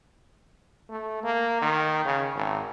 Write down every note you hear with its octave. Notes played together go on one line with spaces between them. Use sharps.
A3
A#3
D#3
C#3
G#1